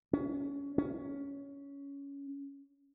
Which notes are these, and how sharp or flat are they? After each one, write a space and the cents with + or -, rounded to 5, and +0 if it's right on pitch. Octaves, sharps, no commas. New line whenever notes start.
C#4 +25
C#4 +15